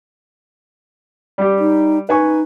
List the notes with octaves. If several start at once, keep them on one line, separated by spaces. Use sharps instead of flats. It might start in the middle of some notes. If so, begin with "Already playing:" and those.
G3 G4
D#4
D#4 B4 G#5 C#6